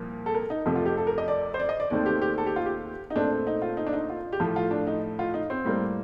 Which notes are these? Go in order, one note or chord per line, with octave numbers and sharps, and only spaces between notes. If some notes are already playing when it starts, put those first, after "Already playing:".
Already playing: C2 A#2 F3 A#3
A4
A#4
D#4
F2 C3 F3 A3
F4
G4
A4
A#4
D#5
D5
C5
D5
D#5
D5
D#2 D#3 A3 C4 D5
G4
G4
A4
G4
F4
G4
D#4
A#2 A3 C4 D4
D#4
F4
D#4
D4
D#4
F4
G4
A2 F3 A3 F4
F4
D4
D#4
F4
D#4
C4
A2 G3 A#3